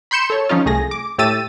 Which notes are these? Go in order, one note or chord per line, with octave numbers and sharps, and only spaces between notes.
B5 C6 G6 C#7 E7
A4 C#5
F3 C#4 D#4 F4
C2 A3 G#4 A#6
D6
A2 A3 G4 E6 A6 D#7